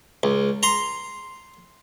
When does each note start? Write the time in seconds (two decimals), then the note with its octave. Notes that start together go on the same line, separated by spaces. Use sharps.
0.23 C#2
0.63 A#5 C6